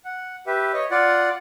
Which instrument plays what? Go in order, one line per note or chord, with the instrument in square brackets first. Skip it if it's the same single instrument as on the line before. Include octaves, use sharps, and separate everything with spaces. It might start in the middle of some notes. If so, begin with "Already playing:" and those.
[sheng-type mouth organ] F#5
G4 B4 E5
C#5 D#5
F4 D5 F#5